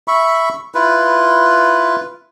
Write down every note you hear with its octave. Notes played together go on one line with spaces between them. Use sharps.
E5 B5 C#6
E4 F4 B4